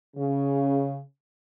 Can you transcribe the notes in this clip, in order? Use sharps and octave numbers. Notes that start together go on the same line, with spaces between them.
C#3